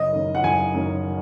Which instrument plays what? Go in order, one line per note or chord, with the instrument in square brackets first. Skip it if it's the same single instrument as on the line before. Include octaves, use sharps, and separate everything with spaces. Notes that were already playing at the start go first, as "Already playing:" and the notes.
Already playing: [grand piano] F#1 [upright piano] D#5
[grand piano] F#2 D#3
[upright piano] F#5
[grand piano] F#1 [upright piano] G#5
[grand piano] F#2 D#3